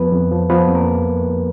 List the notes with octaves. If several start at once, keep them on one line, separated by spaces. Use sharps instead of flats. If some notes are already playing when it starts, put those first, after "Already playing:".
Already playing: F2 F3 B3 B4
F2
F3
F3 B3 B4
F2
A#3 A#4